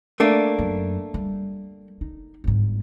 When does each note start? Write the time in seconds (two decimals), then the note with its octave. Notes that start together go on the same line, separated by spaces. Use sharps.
0.20 A3 A#3 D4
0.59 F#2
1.14 G3
2.01 D#4
2.44 G1 G#2